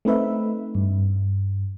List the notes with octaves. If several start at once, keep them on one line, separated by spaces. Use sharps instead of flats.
A3 C4 D#4 B4 E5
G2